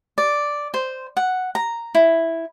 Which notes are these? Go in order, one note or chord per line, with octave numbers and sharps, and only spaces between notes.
D5
C5
F#5
A#5
E4